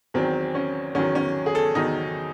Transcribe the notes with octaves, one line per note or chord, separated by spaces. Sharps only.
E2 D#3 F#3 C4
C#4
E2 D#3 F#3 C#4
C#4
G#4
A4
E2 D#3 F#3 D#4